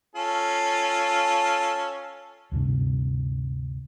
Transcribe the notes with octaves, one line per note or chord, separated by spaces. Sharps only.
C#4 F4 A4
D2 G2 C3